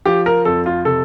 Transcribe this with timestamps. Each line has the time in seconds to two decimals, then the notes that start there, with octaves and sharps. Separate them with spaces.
0.06 F3 G4
0.26 A#4
0.45 F2 A4
0.66 F4
0.85 C3 A4